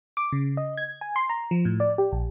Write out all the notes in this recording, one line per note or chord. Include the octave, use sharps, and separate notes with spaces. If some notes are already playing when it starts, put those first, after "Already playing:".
D6
C#3
D#5
G#6
G#5
C6
A#5
F3
A2
D5
G4
A#1